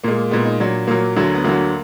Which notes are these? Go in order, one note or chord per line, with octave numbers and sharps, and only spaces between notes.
A#2 G#3 A#3
A#2 G#3 B3
D#4
A#2 F#3 D4
A#2 F#3 A#3
D2 D3 F#3
B3
D2 D3 F#3 A#3